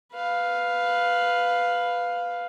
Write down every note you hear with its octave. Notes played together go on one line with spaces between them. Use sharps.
B4 F5